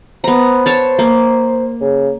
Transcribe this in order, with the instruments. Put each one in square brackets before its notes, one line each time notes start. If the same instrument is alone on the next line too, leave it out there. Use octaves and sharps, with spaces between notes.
[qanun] B3 A#5 [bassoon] C5
[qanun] C#5 A5
A#3
[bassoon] C#3